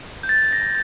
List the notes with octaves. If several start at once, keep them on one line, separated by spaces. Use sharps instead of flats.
G6
A6
A#6